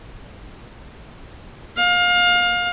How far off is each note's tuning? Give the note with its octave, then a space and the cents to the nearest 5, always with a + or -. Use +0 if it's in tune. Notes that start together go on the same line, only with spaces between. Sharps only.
F5 +25